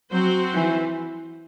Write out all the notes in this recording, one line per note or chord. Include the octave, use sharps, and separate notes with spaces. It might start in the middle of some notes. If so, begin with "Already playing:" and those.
F#3 C4 F#4 C5
E3